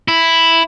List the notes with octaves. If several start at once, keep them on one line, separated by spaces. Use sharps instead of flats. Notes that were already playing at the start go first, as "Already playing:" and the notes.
E4